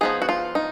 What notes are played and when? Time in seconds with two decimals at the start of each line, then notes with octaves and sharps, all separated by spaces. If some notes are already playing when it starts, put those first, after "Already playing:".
0.01 F3 B3 D#4 G#4
0.22 F#4
0.29 F4
0.55 D#4